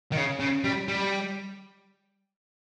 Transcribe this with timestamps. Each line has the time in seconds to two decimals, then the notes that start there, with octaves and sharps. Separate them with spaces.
0.12 D#3
0.17 C#3
0.40 C#3
0.64 G3
0.88 G3